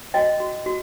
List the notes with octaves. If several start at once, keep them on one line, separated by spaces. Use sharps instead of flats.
F#4 D#5 G5
F#4
F#4